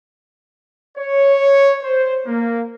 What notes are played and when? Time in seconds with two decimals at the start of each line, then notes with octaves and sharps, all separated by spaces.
0.97 C#5
1.83 C5
2.26 A#3